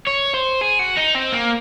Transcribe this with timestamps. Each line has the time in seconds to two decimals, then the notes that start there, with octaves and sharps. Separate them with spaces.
0.07 C#5
0.34 C5
0.61 G#4
0.79 F#4
0.97 D#4
1.14 C4
1.32 A#3